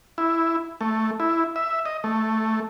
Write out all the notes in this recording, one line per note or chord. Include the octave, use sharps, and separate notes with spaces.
E4
A3
E4
E5
D#5
A3